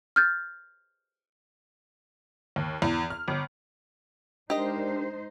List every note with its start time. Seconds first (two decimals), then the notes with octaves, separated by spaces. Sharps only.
0.16 F6 G6 A6
2.56 D#2
2.82 E2
3.10 F6
3.28 G1
4.50 G#3 D4 D#4 G4 A#4 C5 D#5